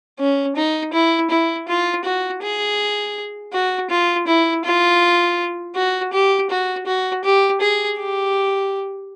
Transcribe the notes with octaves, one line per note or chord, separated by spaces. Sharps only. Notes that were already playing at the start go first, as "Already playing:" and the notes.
C#4
D#4
E4
E4
F4
F#4
G#4
F#4
F4
E4
F4
F#4
G4
F#4
F#4
G4
G#4
G4